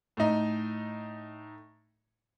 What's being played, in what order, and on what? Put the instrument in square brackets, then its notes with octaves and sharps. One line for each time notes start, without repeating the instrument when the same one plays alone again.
[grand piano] A2 D#4